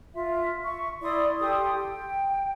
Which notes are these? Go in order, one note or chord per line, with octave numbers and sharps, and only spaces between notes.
F4 E5
E5 C#6
E4 D5 C6 D#6
G4 A4 C6 D#6
G5